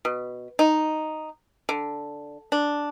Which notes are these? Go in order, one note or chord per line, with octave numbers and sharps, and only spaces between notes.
B2
D#4
D3
D4